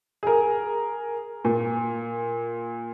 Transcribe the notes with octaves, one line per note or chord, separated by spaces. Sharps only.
G#4 A#4
A#2